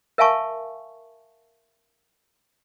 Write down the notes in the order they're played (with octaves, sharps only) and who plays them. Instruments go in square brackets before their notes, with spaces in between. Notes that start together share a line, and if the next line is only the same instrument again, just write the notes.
[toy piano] A#4 E5 F5 G#5 A5 C#6